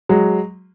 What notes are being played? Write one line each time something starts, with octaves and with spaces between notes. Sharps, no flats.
F#3 G#3